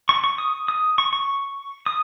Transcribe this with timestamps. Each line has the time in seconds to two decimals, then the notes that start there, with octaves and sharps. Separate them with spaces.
0.09 C#6
0.24 C#6
0.38 D#6
0.68 D#6
0.98 C#6
1.13 C#6
1.86 D#6